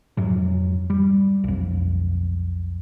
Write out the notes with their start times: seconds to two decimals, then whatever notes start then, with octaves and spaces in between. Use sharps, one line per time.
0.17 F2 G#2 F#3
0.90 G3
1.44 B1 F2